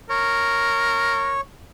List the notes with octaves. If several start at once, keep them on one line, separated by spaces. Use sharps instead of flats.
A#4 C#5